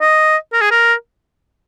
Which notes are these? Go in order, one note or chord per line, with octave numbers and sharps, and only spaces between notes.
D#5
A#4
G#4
A#4